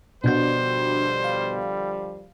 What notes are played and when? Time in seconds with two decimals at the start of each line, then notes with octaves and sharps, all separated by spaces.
0.24 B2 D3 F3 G3 D4 F#4 C5 G6
1.24 F5